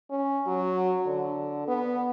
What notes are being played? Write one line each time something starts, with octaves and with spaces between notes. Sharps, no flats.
C#4
F#3
D3
B3